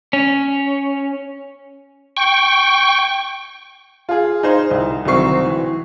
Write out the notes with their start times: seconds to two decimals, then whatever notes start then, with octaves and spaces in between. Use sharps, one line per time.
0.13 C#4
2.17 G5 C#6
4.09 F4 G#4
4.43 D#4 G#4 C5
4.71 C2
5.05 C2 D#3 F#3 C4 C#6 C7
5.45 E3